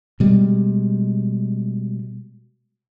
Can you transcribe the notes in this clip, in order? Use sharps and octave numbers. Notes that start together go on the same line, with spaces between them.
B2 G3 G#3